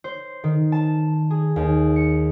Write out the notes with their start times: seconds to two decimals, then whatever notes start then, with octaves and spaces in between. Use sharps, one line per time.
0.04 C5
0.44 D#3
0.72 A5
1.31 G#4
1.56 D#2
1.96 C#7